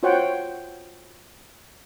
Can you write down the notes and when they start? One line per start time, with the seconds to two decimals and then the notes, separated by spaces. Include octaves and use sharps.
0.03 F4 F#4 C5 C#5 F#5 G5